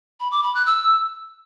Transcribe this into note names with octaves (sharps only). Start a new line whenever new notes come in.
B5
D6
B5
F#6
E6